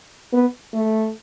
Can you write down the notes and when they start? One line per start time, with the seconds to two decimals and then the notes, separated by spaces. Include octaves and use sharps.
0.33 B3
0.74 A3